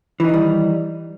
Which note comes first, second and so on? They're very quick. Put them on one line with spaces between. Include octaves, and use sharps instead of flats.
E3 D#4 D#3 G3